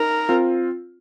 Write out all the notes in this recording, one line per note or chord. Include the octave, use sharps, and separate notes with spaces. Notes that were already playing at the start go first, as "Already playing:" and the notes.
Already playing: D#4 A#4
C4 F4